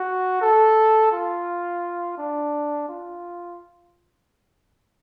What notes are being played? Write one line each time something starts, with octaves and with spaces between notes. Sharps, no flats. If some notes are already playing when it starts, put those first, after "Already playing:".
Already playing: F#4
A4
F4
D4
F4